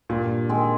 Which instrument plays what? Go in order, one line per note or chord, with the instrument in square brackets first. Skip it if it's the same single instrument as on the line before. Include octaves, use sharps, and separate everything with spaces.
[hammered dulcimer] G2 [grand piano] A#2
[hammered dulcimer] D#3 G#3 C4